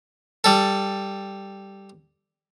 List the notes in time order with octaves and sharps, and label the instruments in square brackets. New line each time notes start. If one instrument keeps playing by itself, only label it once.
[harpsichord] G3 A4